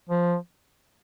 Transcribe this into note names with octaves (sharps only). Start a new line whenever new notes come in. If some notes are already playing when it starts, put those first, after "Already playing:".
F3